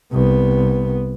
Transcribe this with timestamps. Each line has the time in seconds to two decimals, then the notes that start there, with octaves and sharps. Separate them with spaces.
0.12 C2 B3